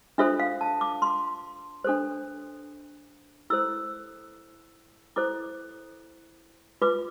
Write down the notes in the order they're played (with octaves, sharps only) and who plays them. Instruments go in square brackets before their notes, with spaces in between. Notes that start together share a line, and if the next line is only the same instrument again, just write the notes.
[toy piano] D4 F4 A4 C5 E5
F5
A5
D6
C6
D4 A4 C5
E4 A4 C5 E6
E4 A4 C5 D6
F4 B4 D6